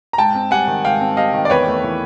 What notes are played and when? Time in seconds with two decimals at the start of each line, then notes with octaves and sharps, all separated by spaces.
0.13 A#5
0.18 G#2 G5 A5
0.35 C4
0.51 G3 F#5 G#5
0.67 D#3
0.84 G#2 F5 G5
1.01 C4
1.17 G3 D#5 F5
1.33 D#3
1.45 D5
1.50 E2 B4 C#5
1.67 A3
1.84 E3